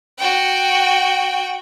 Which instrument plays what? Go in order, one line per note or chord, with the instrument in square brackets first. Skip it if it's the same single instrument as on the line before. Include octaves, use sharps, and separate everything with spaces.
[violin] F#4 G5